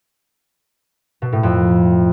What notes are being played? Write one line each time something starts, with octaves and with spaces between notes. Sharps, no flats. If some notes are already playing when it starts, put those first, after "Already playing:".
B2
A2
F2